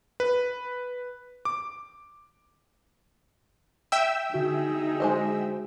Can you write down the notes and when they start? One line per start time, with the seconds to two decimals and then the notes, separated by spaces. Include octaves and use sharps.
0.20 B4
1.45 D6
3.92 E5 G5 E6
4.34 D3 D#4 F#4 G#4
5.00 G#3 C5 D#5